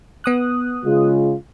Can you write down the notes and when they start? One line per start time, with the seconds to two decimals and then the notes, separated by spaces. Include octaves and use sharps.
0.24 B3 D#6 F#6
0.85 C#3 G#3 F4